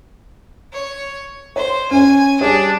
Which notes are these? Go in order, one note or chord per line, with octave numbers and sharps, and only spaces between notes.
C#5
C5 C#5
C#4 C#5 G#5
G3 D4 G#4 C#5